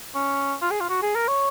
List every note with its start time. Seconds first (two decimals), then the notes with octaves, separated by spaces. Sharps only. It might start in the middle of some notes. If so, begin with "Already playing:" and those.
0.15 C#4
0.62 F4
0.71 G#4
0.80 F4
0.89 F#4
1.02 G#4
1.15 A#4
1.28 C#5